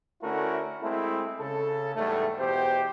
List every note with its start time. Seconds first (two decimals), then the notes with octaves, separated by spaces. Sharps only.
0.22 D3 A3 C#4 E4 F#4 A#4
0.82 G#3 A3 C4 E4
1.40 C#3 A4
1.95 E2 G#2 G3 A3
2.39 E2 B2 G4 C5